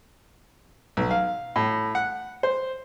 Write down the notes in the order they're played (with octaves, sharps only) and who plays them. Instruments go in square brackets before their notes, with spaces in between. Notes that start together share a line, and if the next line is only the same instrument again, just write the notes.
[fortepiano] B1
F5
A2
F#5
C5